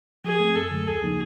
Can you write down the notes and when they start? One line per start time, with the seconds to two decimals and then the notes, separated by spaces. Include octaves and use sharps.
0.25 F3 G#4
0.40 A3 C4
0.55 F#2 A4
0.71 D3 F#3 A3
0.87 D#2 G#4
1.02 C#3 F3 A#3 D#4